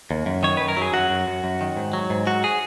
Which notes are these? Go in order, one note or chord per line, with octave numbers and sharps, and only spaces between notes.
D#2
F#2
D#3 C#5
F#2 B4
A#4
F#3 G#4
F#2 F#4
F#2
F#2
F#2
D#3
G#2
F#3
G#2
F#3 F#4
G#4